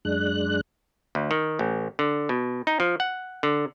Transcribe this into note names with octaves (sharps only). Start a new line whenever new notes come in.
F#2 G#3 D4 F#6
D2
D#3
A1
D3
B2
D#4
F3
F#5
D3